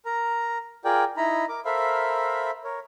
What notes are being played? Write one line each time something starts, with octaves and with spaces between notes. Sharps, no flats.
A#4 A#5
F4 G#4 A#4 D5 G5
D#4 E4 D#5 A#5 B5
A#4 D6
A4 A#4 C5 E5 F5 B5
A#4 C#5